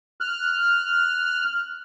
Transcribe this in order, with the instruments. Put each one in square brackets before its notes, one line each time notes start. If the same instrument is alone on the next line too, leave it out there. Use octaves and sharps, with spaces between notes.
[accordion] F6 F#6